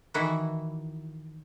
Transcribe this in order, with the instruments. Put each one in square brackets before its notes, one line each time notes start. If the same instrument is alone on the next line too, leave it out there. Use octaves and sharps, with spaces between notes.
[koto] D#3 E3 E4 F#4